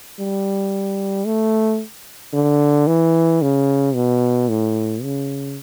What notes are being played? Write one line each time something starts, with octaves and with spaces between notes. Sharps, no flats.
G3
A3
D3
E3
C#3
B2
A2
C#3